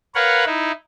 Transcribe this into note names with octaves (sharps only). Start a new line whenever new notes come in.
A#4 B4 C#5 F5 F#5
D#4 E4